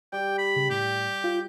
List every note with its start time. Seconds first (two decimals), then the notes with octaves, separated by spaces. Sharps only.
0.13 G3 G5
0.38 B5
0.56 C#3
0.70 A2 G4
1.24 F4